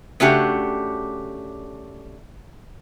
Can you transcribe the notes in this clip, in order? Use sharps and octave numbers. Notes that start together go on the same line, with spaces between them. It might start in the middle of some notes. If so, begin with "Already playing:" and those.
C#3 A3 D4 F#4 G4